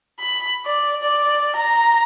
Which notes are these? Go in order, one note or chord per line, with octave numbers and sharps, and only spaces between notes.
B5
D5
D5
A#5